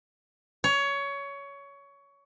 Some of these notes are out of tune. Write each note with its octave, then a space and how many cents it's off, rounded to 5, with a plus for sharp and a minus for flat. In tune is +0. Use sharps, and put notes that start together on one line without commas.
C#5 +20